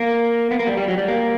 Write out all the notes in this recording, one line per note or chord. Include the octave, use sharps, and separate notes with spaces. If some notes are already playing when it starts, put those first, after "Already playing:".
Already playing: A#3
B3
A#3
G3
G3
F#3
G3
A#3